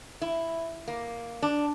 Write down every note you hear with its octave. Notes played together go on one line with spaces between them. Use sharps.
E4
A#3
D4